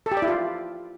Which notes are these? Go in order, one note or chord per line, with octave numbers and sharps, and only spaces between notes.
A4
G4
D5
E4
F4